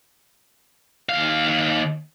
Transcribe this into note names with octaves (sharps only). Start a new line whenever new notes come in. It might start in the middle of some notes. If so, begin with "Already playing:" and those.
D#2 F5